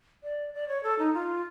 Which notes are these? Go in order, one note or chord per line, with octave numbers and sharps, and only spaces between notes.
D5
D5
C#5
A4
D#4
F4